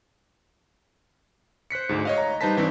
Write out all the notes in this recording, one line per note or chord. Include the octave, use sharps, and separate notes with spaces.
C5 F#6 B6 C#7
D2 G#2
C#5 D#5 F5
A#5
G3 D#4 B4 C5 A5 B6
G2 E3 C4 D4 D#4